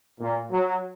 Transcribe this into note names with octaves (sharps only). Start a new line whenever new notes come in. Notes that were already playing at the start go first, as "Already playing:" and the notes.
A#2
F#3